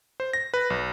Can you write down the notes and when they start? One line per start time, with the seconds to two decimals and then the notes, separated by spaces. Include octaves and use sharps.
0.20 C5
0.33 A#6
0.54 B4
0.70 B1